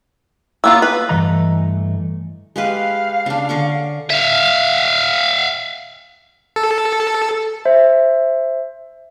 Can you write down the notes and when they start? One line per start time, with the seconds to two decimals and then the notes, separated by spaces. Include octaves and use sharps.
0.64 A#3 B3 F4 E6
0.82 B4
1.09 G2 E3 A3 D#5 A#5
2.56 G#3 G4 B4 F5
3.26 C#3 D4
3.49 D3 C#6 D6
4.10 E5 F5
6.56 A4
7.65 C5 E5